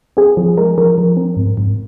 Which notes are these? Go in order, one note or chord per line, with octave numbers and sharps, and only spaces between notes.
C4 G#4
F3
G#3 A#4
F3 A#4
F3
C4
G#2
G#2